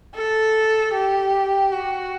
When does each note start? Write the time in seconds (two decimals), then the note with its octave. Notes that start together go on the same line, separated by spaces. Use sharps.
0.15 A4
0.93 G4
1.72 F#4